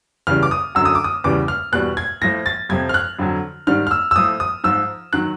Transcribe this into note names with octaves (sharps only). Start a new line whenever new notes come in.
E2 C#3 E3 G3 F6
D6
D#6
F#2 D3 F#3 E6
D#6
D6
D#6
E2 C#3 E3 G3 D6
F6
E2 B2 G3 F#6
G#6
A2 F3 A#6
A6
F2 C3 F3 G#6
F6
F#6
F2 D3 F#3
G#2 D#3 G3 F6
F6
E6
E6
A2 F3 D#6
D#6
G#2 F3 E6
D#3 F#3 F#6